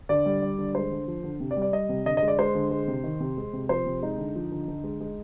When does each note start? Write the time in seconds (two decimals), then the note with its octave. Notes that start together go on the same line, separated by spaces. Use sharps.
0.09 D3 D5
0.26 G3
0.42 G3
0.58 D3
0.74 G#3 C5
0.92 D3
1.07 F3
1.24 D3
1.40 C3
1.51 D5
1.57 G3
1.62 D5
1.73 G3 D#5
1.89 C3
2.06 D3 D#5
2.17 D#5
2.22 G#3
2.28 D5
2.38 G#3 C5
2.55 D3
2.71 G#3
2.88 C3
3.03 D#3
3.20 C3
3.37 G#3
3.53 C3
3.69 F3 C5
3.86 C3
4.02 G#3 D#4
4.18 D3
4.35 F3
4.52 D3
4.68 D3
4.84 G#3
5.00 G#3